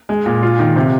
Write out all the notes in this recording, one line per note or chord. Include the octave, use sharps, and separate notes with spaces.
G#3
A#2
F4
D#3
C3